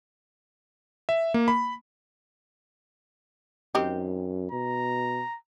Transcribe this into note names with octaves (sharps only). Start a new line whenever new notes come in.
E5
A#3
B5
F#2 D#3 C4 G4
B2 A#5